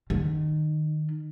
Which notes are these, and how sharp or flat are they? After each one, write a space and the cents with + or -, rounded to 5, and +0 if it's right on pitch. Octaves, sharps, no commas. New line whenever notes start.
D#3 -25